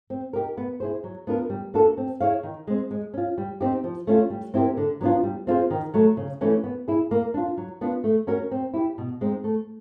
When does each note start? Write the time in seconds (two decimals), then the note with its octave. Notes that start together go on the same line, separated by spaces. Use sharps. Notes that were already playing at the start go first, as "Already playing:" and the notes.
0.10 C4
0.33 D#4 G4 A#4
0.57 B3
0.80 E4 G#4 C5
1.04 F#3
1.27 B3 D4 F4 A#4
1.50 G3
1.74 A#3 D4 F#4 A4
1.98 C4
2.20 E4 G#4 C#5 F5
2.43 D#3
2.67 G#3 C4
2.91 G#3
3.14 C#4 F4
3.38 G3
3.61 C4 D#4 G4
3.84 F3
4.07 A3 C#4 F4
4.30 G3
4.54 C4 E4 G4 A#4
4.77 D3
5.01 F#3 B3 D4 F4
5.23 G3
5.47 C4 F4 G#4 C5
5.70 D#3
5.94 F#3 A3
6.17 C#3
6.41 E3 A3 C#4
6.64 B3
6.88 E4 G#4
7.11 A#3
7.34 D4 F4
7.57 F#3
7.81 B3 D4 F4
8.04 A3
8.27 C#4 F#4 A#4
8.51 C4
8.74 E4 G4
8.98 B2
9.21 G#3 C4 D#4
9.44 A3